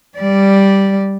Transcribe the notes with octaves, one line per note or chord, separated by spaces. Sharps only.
G3 D5